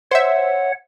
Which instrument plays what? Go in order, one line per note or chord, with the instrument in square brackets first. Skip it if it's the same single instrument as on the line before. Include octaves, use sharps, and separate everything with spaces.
[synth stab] C5 E5 [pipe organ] C#5 F#5